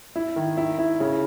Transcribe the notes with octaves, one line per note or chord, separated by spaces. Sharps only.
E4
D#3
E4
E4
C#3